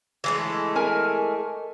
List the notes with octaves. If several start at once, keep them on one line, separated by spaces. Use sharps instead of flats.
E3 G#3 A3
A#4 G#5